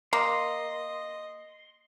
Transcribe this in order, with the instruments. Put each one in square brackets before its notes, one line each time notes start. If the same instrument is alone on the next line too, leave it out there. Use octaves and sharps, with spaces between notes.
[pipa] A#3 [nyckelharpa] D#5 [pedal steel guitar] C6